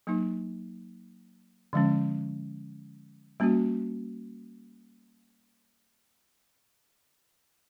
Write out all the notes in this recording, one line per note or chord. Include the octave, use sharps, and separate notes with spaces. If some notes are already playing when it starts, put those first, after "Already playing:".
F#3 A#3 D#4
D3 F3 G#3 C#4
G3 A#3 C#4 F#4